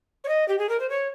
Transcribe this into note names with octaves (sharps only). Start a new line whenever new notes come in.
C#5
D#5
G4
G#4
A#4
C5
C#5